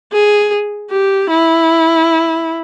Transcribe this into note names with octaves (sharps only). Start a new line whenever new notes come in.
G#4
G4
E4